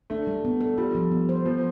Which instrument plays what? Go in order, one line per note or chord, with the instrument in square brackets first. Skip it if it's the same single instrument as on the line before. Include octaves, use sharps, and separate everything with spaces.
[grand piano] A3 [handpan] D4
[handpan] G3
B3
A4
[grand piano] G3 [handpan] F4
[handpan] F3
B3
C5
[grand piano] F3 [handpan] B3